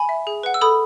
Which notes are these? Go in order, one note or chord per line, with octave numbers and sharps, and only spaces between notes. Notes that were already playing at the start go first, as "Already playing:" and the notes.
Already playing: G#5 B5
E5
G#4
B4 F#5
E6
A4 B5 D#6